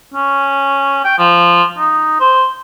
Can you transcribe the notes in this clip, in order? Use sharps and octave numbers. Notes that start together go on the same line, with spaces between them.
C#4
G5
F3
D#4
C5